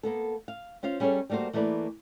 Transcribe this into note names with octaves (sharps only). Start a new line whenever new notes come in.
A#3 B3 A4
F5
C#4 F4 C5 F5
G3 C#4 G#4 A4 C#5
G3 A3 A#3 F#4 C5
E3 A3 A#3 B4 D5